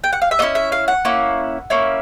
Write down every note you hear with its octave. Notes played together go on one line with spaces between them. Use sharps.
G5
F#5
F5
E5
A#3 C#4 E4 D#5
E5
F5
F#5
A#3 C#4 E4
A#3 C#4 E4